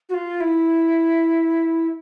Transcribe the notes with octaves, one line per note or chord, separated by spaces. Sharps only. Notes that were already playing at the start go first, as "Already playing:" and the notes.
F#4
F4
E4